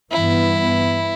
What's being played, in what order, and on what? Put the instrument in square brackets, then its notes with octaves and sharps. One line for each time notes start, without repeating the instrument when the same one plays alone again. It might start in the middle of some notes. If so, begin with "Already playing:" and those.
[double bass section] G2 E3 B3 [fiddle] E4